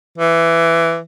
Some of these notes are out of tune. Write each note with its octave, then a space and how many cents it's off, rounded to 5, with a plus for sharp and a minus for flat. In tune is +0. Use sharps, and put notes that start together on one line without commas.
E3 +15